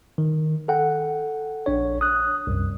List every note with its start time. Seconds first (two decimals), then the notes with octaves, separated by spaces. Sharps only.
0.18 D#3
0.68 A4 F#5 G5
1.66 A#1 D4 C#5
2.01 D#6 F#6
2.47 C2 F#2